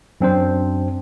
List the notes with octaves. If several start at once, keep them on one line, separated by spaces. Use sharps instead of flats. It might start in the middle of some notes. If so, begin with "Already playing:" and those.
F#2 C4 D4 C5